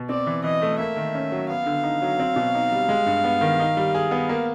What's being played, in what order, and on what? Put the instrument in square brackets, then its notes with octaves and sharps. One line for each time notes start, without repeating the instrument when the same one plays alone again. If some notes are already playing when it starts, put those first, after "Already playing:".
Already playing: [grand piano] B2
[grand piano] C4 [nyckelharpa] D5
[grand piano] E3
[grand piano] E3 [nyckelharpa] D#5
[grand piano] A3
[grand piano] A#3 [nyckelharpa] E5
[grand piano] D#3
C#4
F#3
[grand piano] B3 [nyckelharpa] F5
[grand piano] D3
D#4
F#3
C4
B2
D#4
G3
G#3
G2
B3
D#3
D#4
G3
G#4
B3
A#3